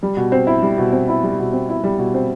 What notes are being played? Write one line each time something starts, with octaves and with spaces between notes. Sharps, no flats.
G3
B2
C4
E4
G3
B2
C4
E4
G3
B2
C4
E4
G3
B2
C4